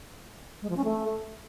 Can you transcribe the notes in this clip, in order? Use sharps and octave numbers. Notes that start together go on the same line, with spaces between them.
G#3
F3
C#4
A3